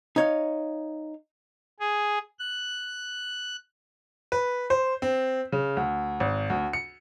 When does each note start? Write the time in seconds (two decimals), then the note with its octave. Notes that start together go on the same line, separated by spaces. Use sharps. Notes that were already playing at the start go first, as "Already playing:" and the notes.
0.16 D#4 C#5 F5
1.80 G#4
2.39 F#6
4.32 B4
4.70 C5
5.02 C4
5.52 C#3
5.77 D2
6.20 G#1
6.50 D2
6.73 C#7